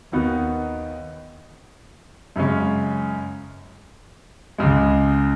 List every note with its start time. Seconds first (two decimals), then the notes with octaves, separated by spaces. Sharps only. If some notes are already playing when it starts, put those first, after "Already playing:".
0.12 D#2 D#3 B3 D#4 F#4
2.36 F#2 C#3 G#3 C#4
4.58 C#2 C#3 G#3